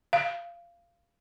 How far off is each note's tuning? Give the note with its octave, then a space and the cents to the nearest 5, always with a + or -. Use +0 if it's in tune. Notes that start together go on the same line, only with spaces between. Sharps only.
F5 -20